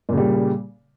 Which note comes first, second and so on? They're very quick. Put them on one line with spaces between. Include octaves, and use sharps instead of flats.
A#2 C#3 G3